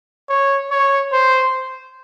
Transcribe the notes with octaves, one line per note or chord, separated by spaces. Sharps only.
C#5
C#5
C5